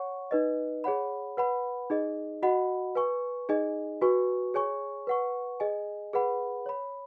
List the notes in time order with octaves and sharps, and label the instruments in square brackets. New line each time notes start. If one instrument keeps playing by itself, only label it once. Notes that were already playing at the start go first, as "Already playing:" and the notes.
Already playing: [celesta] C#5 F#5 C#6
D#4 B4 D#5
G#4 C#5 F#5 B5
B4 F#5 B5
D#4 G#4 D#5
F#4 D#5 F#5 B5
B4 G#5 C#6
D#4 G#4 D#5 G#5
F#4 B4 G#5 C#6
G#4 C#5 G#5 C#6
B4 F#5 C#6
G#4 D#5 G#5
G#4 B4 F#5 B5
C#5 B5